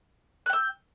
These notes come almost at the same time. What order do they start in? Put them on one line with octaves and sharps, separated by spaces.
F#6 G5 E6